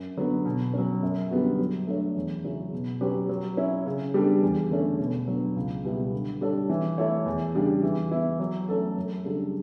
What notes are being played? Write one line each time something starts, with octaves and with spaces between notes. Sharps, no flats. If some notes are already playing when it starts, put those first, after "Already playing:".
Already playing: F#2
D3 F#3 B3
B2
F#3 C#4
F#2
D3 G3 B3 F#4
F#3
A3 D4 A4 C#5
E2
C#3 F#3 C#4 E4
B2
F#3 C#4 G4 B4
F#3
C#4 E4
C#3
G3 B3 D4 A4
E2
D3 A3 C#4
B2
F#3 B3 D4
C#2
B2 G3 B3 E4
D3
G3 D4 A4 C#5
E3
A3 E4 A4 C#5
E2
C#3 G3 D4
E3
B3 E4
F#3
A3 C#4 F#4 A4
F#2
C#3 G3 D4 A4